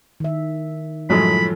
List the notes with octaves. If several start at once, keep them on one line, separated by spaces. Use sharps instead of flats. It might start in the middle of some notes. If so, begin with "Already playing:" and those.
D#3 E5
F#2 A2 F3 F#3 G#3 A4 B5